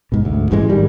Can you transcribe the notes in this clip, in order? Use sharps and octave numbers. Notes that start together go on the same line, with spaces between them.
G#2 B2
D2
A1 G#2 E3 G#3
D#3 G3